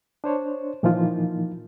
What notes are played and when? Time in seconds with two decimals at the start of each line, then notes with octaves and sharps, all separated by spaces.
0.24 D4 C5 C#5
0.83 A#2 E3 F3 A#3 D#4 F4